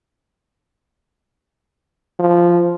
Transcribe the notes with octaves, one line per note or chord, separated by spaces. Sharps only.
F3